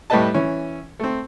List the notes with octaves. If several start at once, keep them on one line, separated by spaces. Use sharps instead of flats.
A2 G3 A3 B4 D#5 A5
E3 C#4
A3 C4